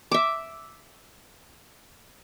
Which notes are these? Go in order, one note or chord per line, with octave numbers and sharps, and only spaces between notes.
E5 D6